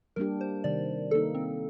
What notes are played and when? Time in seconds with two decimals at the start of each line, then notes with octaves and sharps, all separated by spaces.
0.16 G3 A#3 D4 G4 A#4
0.41 C5
0.64 C3 D#3 G3 D5
1.11 D#3 A#3 D#4 A4
1.35 C4